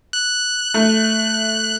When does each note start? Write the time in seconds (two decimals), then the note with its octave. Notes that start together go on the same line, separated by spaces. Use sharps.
0.13 F#6
0.74 A3